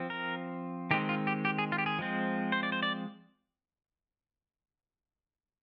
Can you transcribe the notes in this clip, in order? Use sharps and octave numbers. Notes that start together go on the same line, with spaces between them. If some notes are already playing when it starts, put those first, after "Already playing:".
Already playing: F3 C4
A#4
D#3 G#3 C4 G4
F4
G4
G4
G#4
F4
G4
G#4
F3 G#3 C4
C5
D5
C5
D5